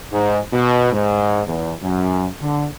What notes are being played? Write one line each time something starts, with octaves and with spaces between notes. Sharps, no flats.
G#2
B2
G#2
E2
F#2
D3